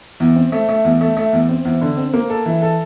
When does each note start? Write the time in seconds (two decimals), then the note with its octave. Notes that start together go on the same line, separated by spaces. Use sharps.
0.20 E2
0.36 C4
0.52 A3
0.69 A3
0.85 E2
1.01 A3
1.17 A3
1.33 E2
1.49 C4
1.65 E2
1.81 D3
1.97 C4
2.14 A#3
2.30 A4
2.46 E3
2.62 A4